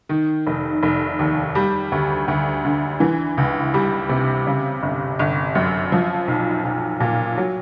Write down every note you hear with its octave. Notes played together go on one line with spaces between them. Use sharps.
D#3
F1
F1
D#2
G3
D2
D2
D3
E3
C#2
G3
C3
C#3
G1
G1
F#2
F3
B1
B1
A#2
F#3